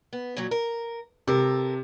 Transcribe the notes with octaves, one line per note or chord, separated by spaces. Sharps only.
B3
A#2 C#3 F#3
A#4
C3 A4 A#4